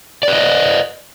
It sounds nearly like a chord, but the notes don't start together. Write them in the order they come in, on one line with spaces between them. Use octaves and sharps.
D5 B4 D#5